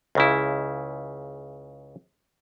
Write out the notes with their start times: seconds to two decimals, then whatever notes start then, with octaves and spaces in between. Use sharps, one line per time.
0.15 C#2 C#3 E4